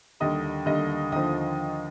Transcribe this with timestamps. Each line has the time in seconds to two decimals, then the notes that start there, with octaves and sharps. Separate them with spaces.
0.20 D#2 D3 G3 D#5 D#6
0.66 D#2 D3 G3 D#5 D#6
1.12 D#2 D3 F3 D#5 D#6